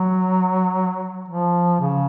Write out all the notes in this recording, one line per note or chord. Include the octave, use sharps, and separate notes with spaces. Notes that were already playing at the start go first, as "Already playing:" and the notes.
Already playing: F#3
F3
C#3